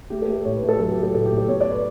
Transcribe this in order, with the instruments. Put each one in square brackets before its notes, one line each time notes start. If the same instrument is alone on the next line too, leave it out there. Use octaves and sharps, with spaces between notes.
[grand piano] A3 G4
A4
A3
A4
A2 C#5
B4
A3
A4
F#3 A4
G4
A3
A4
A2 A4
G4
A2
A4
B3 C#5
D5
B4